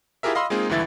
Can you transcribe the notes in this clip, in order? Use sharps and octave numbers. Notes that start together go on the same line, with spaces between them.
E4 F4 G4 G#4 A#4 E5
D#5 F5 B5 C6 D#6 E6
G#3 A#3 C4 D#4 F4 G#4
C#2 G2 D3 E3 E4 A6